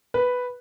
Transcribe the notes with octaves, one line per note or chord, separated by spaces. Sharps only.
B4